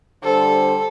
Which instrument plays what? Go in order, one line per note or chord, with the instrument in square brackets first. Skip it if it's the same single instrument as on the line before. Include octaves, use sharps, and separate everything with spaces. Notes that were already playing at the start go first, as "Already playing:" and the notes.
[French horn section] D3 G3 C5 [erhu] A4